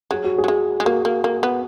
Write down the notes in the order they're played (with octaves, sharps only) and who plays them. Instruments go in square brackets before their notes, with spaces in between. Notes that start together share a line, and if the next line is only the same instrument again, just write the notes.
[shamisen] F#3 [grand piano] G#4
[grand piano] F#4
G#4
[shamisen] F#3
G#3
G#3
[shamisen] A#3 [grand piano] F#4
[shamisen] A#3
A#3
B3